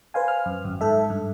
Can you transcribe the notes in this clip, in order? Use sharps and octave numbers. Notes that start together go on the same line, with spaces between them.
B4 C5 F5 G#5
F6
F#2
G#1 F#2
G#2 A4 E5
G2